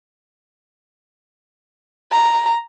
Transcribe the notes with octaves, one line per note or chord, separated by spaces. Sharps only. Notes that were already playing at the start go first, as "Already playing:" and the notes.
A#5